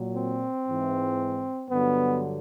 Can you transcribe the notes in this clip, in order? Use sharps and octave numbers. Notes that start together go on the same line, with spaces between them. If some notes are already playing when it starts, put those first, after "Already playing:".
Already playing: A#2 F#3
C4
G#2 E3
G2 D3 F#3 B3